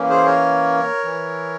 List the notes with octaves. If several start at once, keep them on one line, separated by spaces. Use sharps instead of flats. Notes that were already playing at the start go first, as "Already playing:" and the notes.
Already playing: E3 A#3 C#4
G#4 C5
A#4 C#5
E3